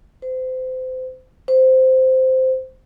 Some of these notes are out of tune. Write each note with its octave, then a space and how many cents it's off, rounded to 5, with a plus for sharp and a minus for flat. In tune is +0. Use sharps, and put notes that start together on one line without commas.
C5 -30
C5 -10